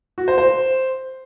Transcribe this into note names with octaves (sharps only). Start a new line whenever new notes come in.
F#4
C5
C5